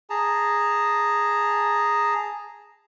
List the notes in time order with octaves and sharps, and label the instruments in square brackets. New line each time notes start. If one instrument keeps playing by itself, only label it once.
[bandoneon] G#4 A5 A#5